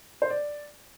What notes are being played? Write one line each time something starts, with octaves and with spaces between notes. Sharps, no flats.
C5
D5